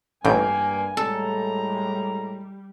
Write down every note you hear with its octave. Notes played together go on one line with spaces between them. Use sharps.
A1 G2 A#3 G5 G#5
A2 G3 G#3 A4 A#5